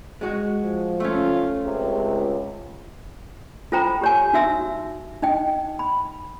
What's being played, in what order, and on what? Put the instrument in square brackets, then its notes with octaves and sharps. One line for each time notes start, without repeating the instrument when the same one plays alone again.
[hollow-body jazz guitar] G#3 F#4
[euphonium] F3
[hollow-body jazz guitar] A3 C#4 [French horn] F4
[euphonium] C#2 [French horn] C3
[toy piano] F4 A4 C5 G5 A#5 B5
G4 C#5 G#5
D#4 F#4 E5 E6
D#4 D#5 G5
B5